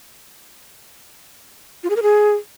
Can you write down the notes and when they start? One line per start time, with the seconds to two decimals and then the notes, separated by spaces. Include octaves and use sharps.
1.84 F4
1.90 G#4
1.96 A#4
2.03 G#4